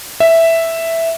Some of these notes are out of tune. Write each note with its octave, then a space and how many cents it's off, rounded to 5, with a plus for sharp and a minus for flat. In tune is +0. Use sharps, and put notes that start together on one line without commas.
E5 +0